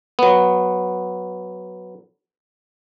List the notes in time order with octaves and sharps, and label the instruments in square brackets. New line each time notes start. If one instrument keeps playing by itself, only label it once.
[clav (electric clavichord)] F#3 B3